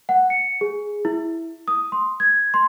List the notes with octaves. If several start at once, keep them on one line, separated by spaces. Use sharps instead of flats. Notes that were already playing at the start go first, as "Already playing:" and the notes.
F#5
C#7
G#4
E4
D#6
C6
G#6
C6